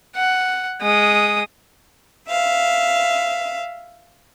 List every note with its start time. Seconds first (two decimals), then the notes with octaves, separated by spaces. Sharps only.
0.16 F#5
0.81 G#3 D#6
2.29 E5 F5